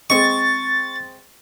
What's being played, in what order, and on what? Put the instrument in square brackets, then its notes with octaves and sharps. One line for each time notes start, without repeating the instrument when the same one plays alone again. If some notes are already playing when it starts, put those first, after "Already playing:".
[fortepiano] G#3 C4 D#5 [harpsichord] C#6 [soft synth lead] A6